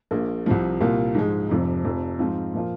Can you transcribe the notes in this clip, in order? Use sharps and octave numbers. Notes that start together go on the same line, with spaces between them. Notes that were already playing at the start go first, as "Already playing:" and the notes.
A#1 A#2 A#3
C2 C3 F3
C2 A#2 A#3 F4
G#2 F3 G#3
F1 F2 C3 F3
F1 F2 F3
G#2 F3 C4 F4
A#2 F3 A#3 F4